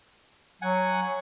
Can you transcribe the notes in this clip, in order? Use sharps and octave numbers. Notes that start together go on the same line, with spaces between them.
F#3 F#5 G#5